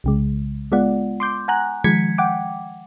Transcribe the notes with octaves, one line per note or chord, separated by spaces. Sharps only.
C2 C#3 G#3
G#3 B3 F4 D5 F#5
C6 D6 G6
F#5 G#5 A#5 F#6
D#3 F3 G#3 G#6 B6 C#7
F#5 G5 D6